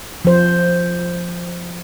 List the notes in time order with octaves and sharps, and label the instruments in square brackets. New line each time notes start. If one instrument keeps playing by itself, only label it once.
[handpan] F3 C5